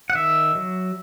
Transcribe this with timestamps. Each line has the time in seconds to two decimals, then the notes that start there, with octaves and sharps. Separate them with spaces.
0.10 F#5
0.14 D#3 E5
0.55 F#3